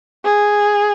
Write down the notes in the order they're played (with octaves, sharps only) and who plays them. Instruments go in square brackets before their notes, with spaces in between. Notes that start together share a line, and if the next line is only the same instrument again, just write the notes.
[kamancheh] G#4